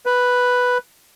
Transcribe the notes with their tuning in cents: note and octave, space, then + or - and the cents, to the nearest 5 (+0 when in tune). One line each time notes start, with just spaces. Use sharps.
B4 +0